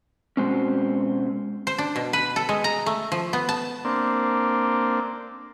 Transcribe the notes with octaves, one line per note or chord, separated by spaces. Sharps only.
B2 G#3 C4 C#4
C5
D4
B2
B4
A4
G#3
A#5
A3
F3
B3
A5
A#3 C4 D4